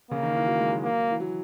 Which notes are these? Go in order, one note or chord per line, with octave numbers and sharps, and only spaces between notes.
C#3 A#3
D#3
E3
F#3
G#3
F#3
A#3
E3
F#3